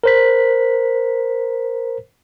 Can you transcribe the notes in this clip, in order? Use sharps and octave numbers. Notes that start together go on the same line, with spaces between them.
A#4 C5 B6